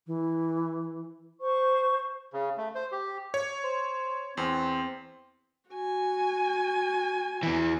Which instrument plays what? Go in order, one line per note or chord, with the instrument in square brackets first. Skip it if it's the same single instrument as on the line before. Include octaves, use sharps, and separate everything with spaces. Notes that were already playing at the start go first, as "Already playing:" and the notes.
[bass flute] E3
[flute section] C5 C#6
[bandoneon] C#3
A3
C5
G4
[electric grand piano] C#5
[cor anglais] C5
[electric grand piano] E2 [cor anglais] C4
[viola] F#4 G#5
[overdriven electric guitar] E2 E3